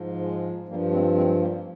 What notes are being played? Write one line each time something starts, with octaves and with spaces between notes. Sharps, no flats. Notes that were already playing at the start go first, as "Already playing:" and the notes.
Already playing: G#2 F3
G#3
G2 F3 G3 A#3
G#3 C4
G#3 C4
G3 A#3